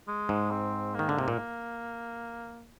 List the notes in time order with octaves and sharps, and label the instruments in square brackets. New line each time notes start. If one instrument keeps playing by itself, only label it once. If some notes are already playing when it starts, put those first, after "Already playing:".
[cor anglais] G#3
[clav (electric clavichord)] G#2
[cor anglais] C4
[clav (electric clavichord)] D#3 [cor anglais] A#3
[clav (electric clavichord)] D3
C3
A#2